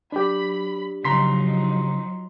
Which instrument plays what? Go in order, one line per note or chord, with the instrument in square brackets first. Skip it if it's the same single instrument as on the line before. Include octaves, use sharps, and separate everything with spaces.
[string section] F#3 B5 B6 [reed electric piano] D4 G4
[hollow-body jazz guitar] C#3 [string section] F3 F#3 D#4 [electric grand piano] A#5 C6 B6